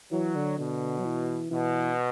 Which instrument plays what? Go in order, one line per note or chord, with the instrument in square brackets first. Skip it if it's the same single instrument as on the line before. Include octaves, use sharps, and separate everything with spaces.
[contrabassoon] E3 [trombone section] F#3
[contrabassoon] D3
[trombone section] B2 [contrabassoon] D3
[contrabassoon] F#3
E3
[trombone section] B2 [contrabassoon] E3